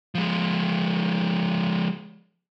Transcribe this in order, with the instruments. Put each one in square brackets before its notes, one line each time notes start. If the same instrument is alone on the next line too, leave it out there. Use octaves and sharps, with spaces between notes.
[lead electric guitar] F3 G#3